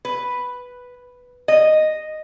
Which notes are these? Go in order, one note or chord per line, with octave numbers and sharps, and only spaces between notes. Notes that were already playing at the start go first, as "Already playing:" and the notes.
B4
D#5